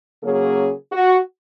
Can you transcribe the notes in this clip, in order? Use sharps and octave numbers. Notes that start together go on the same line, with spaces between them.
C#3 F#3 A#3 C#4 G#4
F#4